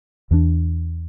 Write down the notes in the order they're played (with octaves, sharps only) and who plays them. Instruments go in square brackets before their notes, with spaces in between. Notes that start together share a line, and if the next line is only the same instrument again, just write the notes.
[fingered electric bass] E2 E3 G3 D4